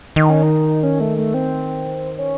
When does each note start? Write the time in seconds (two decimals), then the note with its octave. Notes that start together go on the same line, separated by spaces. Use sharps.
0.16 D#3 D#4
0.30 C#4
0.43 D#4
0.83 C#4
1.00 A3
1.18 A3
1.34 C4
2.18 C#4